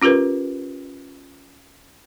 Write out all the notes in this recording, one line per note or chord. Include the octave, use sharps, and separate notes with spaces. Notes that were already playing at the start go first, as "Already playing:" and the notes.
C#4 F4 G4 A#4 B4